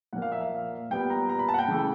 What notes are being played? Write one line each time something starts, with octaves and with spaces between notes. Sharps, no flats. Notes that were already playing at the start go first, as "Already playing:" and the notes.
A#2 F3 A#3 F#5
F5
E5
F5
A#2 G3 B3 G5
A#5
A#5
B5
A5
F#5
G5
C#3 E3 A3